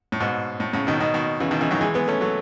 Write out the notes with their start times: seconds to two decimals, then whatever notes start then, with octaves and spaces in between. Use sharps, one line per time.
0.12 A2
0.20 G#2 B2
0.60 A2
0.73 A2 C#3
0.87 B2 D#3
1.00 B2 D#3
1.14 B2 D#3
1.40 C#3 E3
1.51 B2 D#3
1.61 C#3 E3
1.71 D#3 F#3
1.81 E3 G#3
1.94 G#3 B3
2.08 A3 C#4
2.21 F#3 A3